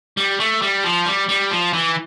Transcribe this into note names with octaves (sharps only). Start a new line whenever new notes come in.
G3
A3
G3
F3
G3
G3
F3
E3